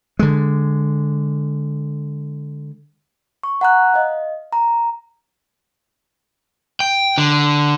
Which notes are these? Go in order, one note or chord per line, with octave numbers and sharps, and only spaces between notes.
D3 G#3
C#6
F#5 A#5 F#6
D#5 F5
A#5
G5
D3